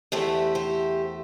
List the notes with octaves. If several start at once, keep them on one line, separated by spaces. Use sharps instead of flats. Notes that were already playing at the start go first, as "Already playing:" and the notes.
E2 E3 A3 E4 G4 C5
G4 C5